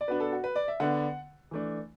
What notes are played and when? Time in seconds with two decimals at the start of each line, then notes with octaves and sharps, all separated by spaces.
0.01 D5
0.08 B2 B3 D4 B4
0.20 A4
0.32 F#4
0.44 B4
0.56 D5
0.68 E5
0.80 D3 B3 D4 F#5
1.51 E3 A3 D4